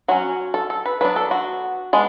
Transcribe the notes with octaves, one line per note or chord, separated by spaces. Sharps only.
F#3 C#4 F#4
A4
A4
B4
F#3 B3 D4 B4
A4
F#4
G#3 B3 D4